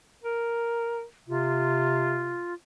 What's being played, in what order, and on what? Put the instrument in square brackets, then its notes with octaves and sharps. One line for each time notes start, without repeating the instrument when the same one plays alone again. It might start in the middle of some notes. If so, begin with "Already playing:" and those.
[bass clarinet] A#4
[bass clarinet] C3 [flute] F4